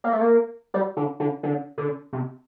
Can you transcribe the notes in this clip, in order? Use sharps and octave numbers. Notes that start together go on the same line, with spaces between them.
A#3
A3
A#3
G3
D3
D3
D3
D3
C3